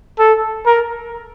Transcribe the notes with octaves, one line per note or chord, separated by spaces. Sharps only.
A4
A#4